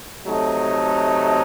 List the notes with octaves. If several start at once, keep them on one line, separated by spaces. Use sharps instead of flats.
C3 F#3 A3 D#4